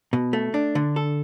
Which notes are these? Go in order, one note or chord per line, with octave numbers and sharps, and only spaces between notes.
B2
A3
D4
D3
A4